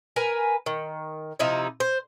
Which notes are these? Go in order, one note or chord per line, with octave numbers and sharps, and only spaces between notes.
A#4 B4 G#5
D#3
C3 F3 D#4 E4
C5